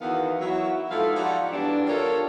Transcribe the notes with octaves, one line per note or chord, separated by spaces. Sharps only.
E2 D#3 E3 B3 F#4 F5
F#3 E4 F#4
G#2 F3 B3 E4 A4 F5
F3 D#4 F#4 G4 D5 F#5
E2 G2 E3 G3 D4
D4 F4 G4 A4 A#4 C#5